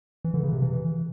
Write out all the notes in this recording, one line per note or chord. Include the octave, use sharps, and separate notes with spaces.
E3
D3
C#3
C3
E3